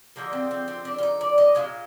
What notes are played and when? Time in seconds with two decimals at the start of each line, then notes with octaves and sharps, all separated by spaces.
0.16 D3 F3 G#3 A#3
0.33 C4
0.51 C4
0.68 C4
0.85 D4
0.98 F4
1.03 D#4
1.21 D5
1.38 D#5
1.55 A#2 F3 G#3 F5